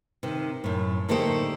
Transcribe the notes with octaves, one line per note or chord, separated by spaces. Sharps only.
C3 D#3
F#2 A2
D3 A3 A#3 D#4 G4 C5